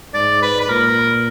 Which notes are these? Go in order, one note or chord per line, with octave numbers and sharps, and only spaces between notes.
G#2 D5
B4
B4
A#2 A#4